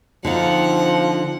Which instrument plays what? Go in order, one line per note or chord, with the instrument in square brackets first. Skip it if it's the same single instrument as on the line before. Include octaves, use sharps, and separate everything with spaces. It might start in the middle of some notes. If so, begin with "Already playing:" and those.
[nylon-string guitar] D3 D#4 F4 [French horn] F3 [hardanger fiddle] C4 F#5